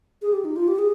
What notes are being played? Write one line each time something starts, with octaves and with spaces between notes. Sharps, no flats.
G#4
G4
D#4
F4
G4
G#4